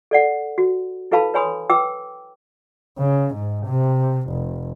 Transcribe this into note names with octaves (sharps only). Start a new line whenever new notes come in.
A4 D5 F#5
F#4
E4 A4 B4 F5 A5 B5
B4 C#5 G#5 B5 C6 D#6
B4 G5 D6 E6
C#3
G#2
C3
F1